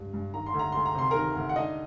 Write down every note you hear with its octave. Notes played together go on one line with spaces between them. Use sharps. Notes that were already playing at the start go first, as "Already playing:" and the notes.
Already playing: G2 G3
G2
D#3 A#5
C6
D2
A#5
D2 C6
A#5
C3 C6
D#3 A#4 A#5
D2
F#5
D4 D#4 D#5